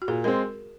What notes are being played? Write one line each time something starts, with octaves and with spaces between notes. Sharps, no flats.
F#4
A#2 G#4
G#3 C4 A#4